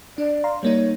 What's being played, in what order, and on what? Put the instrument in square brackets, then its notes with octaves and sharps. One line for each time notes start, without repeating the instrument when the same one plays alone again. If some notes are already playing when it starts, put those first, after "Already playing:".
[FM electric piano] D4 [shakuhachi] D5
[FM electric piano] F5 A#5 C6
[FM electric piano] G3 A#3 D#4 [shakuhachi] C#5